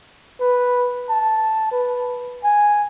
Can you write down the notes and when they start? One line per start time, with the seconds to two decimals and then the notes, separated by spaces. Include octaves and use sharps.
0.40 B4
1.09 A5
1.71 B4
2.44 G#5